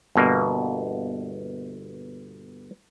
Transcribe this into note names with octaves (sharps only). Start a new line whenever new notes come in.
G1 B2 A#3